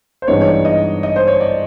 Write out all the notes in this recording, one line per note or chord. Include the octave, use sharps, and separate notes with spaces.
C5
G2 E3 G#3 B3 D#4 C#5
C#5
D5
D#5
D#5
C5
C#5
D5